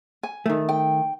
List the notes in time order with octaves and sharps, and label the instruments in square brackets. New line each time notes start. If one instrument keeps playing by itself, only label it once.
[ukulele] G#5
[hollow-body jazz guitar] D#3 A3
[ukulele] G5